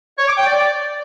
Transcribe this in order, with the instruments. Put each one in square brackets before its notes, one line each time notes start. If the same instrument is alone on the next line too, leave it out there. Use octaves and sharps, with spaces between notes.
[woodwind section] C#5
D6
G5
D5